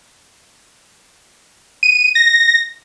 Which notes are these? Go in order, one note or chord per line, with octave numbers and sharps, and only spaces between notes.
D#7
A#6